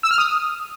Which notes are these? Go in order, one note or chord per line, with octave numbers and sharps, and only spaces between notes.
E6
F6
D#6